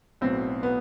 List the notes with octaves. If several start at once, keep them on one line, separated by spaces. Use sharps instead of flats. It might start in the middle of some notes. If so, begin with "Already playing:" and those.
B1 A2 F#3 B3 C4
B3